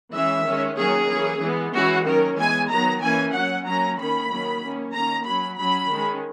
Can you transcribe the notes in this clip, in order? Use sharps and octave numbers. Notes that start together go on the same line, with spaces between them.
E3 G#3 C#4 E5
D#3 G#3 C#4
D#3 F#3 A#3 C#4 G#4
E3 A#3 C#4
E3 G#3 B3
E3 G#3 C#4 F#4
D#3 F#3 A#3 C#4 A#4
E3 G#3 B3 G#5
D#3 F#3 B3 A#5
E3 A#3 C#4 G#5
F#3 C#4 F#5
F#3 A#3 C#4 A#5
D#3 A#3 C#4 B5
D#3 F#3 A#3 C#4
D#3 A#3 C#4
D#3 A#3 C#4 A#5
F#3 C#4 B5
F#3 C#4 B5
D#3 G#3 C#4